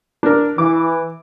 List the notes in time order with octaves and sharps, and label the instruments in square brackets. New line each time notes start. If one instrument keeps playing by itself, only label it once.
[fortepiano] D4 A#4
[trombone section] E3 [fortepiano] D6